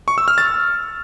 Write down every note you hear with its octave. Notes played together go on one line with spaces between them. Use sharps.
C#6
E6
F6
A6